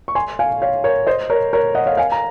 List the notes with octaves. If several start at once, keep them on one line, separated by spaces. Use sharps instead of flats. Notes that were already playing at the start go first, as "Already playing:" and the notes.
C#6
G#5 C6
F5 G#5
C#5 F5
A#4 C#5
C5 D#5
A#4 C#5
A#4 C#5
D#5 F#5
C#5 F5
F5 G#5
A#5